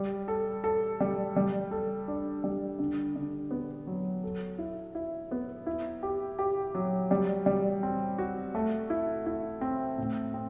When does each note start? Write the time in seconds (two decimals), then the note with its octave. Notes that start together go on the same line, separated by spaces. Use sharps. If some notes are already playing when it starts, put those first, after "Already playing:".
Already playing: G3
0.28 A4
0.64 A4
1.00 G3
1.36 G3
1.71 A4
2.08 D4
2.44 G3
2.79 D3
3.16 D3
3.51 B3
3.87 F#3
4.23 A4
4.58 E4
4.95 E4
5.31 B3
5.66 E4
6.03 G4
6.39 G4
6.75 F#3
7.11 G3
7.46 G3
7.83 C4
8.18 F#4
8.55 A3
8.90 E4
9.26 E4
9.61 C4
9.98 A2
10.34 C4